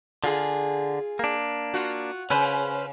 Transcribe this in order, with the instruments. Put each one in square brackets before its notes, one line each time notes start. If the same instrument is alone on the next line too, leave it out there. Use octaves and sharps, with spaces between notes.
[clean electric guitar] D3 [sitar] F4 G#4
[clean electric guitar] A#3 D4
[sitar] F4 F#4
[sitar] C#3 [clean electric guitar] C#4 B4 C5